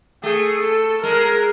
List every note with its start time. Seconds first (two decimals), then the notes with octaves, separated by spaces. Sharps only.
0.23 A3 G#4
0.63 A4
1.03 G#3 A#4